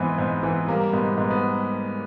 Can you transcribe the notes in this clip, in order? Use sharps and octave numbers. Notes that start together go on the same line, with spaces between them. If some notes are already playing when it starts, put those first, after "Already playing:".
Already playing: G#2 E3 B3 C4
G#2 B3
E3 B3
G3 A#3
G#2 B3
G#2 B3
B3